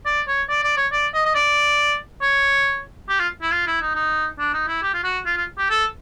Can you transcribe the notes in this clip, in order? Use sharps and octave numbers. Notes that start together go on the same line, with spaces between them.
D5
C#5
D5
D5
C#5
D5
D#5
D#5
D5
C#5
G4
F4
E4
F4
E4
D#4
D#4
D4
D#4
E4
G4
F4
F#4
F4
F4
G4
A4